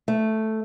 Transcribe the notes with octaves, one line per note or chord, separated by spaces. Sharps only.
A3